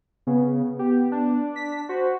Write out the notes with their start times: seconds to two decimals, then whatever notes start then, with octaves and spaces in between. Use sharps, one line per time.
0.27 C#3 B3
0.79 G4
1.12 D4
1.56 B6
1.89 F#4 C5